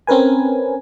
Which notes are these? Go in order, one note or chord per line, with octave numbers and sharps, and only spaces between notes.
C4 C#4 A#4 B4 G#5